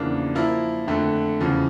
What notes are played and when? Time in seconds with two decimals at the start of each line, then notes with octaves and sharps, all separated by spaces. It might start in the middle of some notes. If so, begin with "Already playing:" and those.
Already playing: E2 C#3 F3 A#3 D4
0.35 F3 A#3 E4 A#4
0.88 F2 D3 A3
1.40 E2 C#3 F3